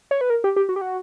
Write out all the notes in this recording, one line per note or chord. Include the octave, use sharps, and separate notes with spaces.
C#5
B4
A#4
G4
G4
F#4
G4
F#4